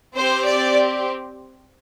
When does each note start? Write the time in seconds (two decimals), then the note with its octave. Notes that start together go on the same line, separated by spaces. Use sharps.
0.16 C4 G4 C5
0.45 D5